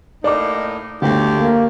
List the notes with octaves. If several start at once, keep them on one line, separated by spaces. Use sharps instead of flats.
A2 A#3 D#4 D5 D6
G1 D2 A3 G4
A#3